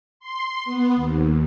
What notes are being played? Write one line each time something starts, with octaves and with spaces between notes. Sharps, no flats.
C6
B3
D#2